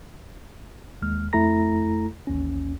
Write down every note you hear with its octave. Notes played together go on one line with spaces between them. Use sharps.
D#2 G#3 F6
F2 A3 E4 A4 A#5 A#6
A1 D#2 C#4